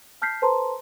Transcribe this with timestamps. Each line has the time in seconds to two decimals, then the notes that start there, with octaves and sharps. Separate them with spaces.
0.22 A5 F6 G6 B6 C7
0.42 A4 B4 C5 A5 A#5 C6